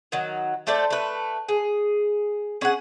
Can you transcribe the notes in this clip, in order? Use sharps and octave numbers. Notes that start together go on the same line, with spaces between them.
D#3 F#3
A3 A4 C5 D5
A3 B4
G#4
C#4 G#4 F#5